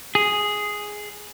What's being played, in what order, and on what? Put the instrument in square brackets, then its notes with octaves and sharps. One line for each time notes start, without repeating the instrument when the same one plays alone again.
[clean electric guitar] G#4